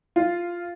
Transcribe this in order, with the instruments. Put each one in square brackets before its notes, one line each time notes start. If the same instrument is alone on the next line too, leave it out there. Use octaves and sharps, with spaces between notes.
[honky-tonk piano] F4